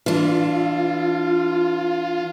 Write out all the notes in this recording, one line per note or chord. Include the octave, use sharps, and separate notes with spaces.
E3 D4 F4